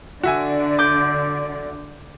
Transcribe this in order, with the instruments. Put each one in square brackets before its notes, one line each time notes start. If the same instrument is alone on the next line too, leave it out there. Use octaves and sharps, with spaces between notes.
[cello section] D3 D5 [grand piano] F#4 E5 G#5
[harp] D6 G6